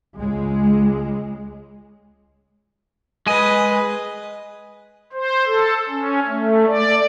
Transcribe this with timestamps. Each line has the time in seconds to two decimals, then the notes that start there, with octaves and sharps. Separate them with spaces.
0.17 C#2 G#3
3.27 G#3 B4 D#5 G#5
5.13 C5
5.46 A4
5.89 C#4
6.27 A3
6.67 D5